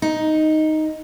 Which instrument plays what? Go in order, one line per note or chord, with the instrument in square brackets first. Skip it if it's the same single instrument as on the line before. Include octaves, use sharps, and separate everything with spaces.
[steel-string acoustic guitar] D#4